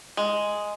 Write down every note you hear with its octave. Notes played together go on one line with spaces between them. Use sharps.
G#3